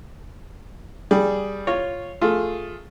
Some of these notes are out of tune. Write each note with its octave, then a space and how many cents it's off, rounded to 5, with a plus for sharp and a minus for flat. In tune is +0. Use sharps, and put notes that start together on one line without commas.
G3 +0 G#4 +0
F4 +0 C#5 -5
A3 +0 F4 +10 G#4 +0